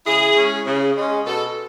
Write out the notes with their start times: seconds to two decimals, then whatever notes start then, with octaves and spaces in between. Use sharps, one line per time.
0.06 C#3 E4 G#4
0.36 G#3 C#4
0.66 C#3
0.97 G#3 C#4
1.26 B2 F#4 A4